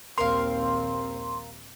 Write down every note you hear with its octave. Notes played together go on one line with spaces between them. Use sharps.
A#1 D#2 C4 A#4 F5 C6